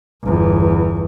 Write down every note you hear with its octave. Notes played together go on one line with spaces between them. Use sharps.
G1 E2